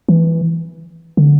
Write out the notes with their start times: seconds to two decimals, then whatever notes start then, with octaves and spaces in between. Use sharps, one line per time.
0.09 E3
1.17 D3